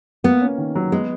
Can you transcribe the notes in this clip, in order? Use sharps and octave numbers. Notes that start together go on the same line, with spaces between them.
A#3 B3
C#4
D#3
F#3
G#3 B3